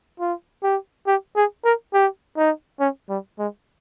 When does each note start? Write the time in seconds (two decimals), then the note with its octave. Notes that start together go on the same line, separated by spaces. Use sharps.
0.20 F4
0.63 G4
1.07 G4
1.36 G#4
1.65 A#4
1.93 G4
2.37 D#4
2.80 C#4
3.09 G3
3.38 G#3